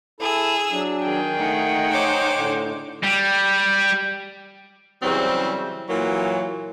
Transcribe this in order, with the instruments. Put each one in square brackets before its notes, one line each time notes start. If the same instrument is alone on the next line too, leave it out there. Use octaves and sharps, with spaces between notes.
[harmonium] E4 A4 [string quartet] G#4 E6
[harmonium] F#3 D4
[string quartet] D#3 [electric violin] G#4 G5
[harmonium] A3 [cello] D#4 F#5
[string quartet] C5 C#5 D6
[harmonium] A2 D3
[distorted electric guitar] G3
[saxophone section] C#3 E3 F#3 G3 C4 C5
A#2 E3 F#3 A#3